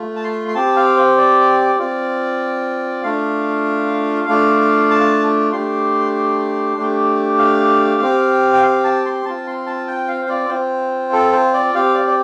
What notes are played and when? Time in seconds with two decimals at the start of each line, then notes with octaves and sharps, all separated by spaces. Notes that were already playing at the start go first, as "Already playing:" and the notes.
Already playing: A3 F4
0.16 A5
0.24 C6
0.48 C6
0.55 C4 G4 A5
0.76 F5
0.97 C5
1.18 D5
1.79 C4 F4 D5
3.03 A3 D4 F4 F5
4.28 A3 D4 F4
4.91 A5
5.52 A3 D4 G4 C6
6.77 A3 D4 G4
7.39 F5
8.02 C4 G4
8.53 G5
8.63 F5
8.84 A5
9.05 C6
9.25 C4 F4 A5
9.47 C6
9.66 A5
9.87 G5
10.08 F5
10.22 C5
10.29 D5
10.49 C4 F4 C5
11.13 A4
11.33 C5
11.54 D5
11.74 C4 G4 F5
11.94 D5
12.08 D5